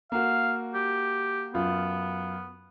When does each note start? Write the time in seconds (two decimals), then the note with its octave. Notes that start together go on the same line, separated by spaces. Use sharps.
0.12 A#3 F#4 F5
0.74 G4
1.54 F#2 B3 F4